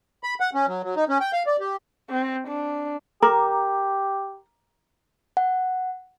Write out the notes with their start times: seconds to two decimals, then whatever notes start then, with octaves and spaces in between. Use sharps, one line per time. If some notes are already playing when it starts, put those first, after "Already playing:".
0.23 B5
0.40 F#5
0.54 C#4
0.68 F#3
0.83 F#3
0.96 D#4
1.09 C#4
1.21 G5
1.33 F5
1.47 D5
1.60 G4
2.10 C4
2.48 D4
3.23 G4 A#4 A#5 D6
5.37 F#5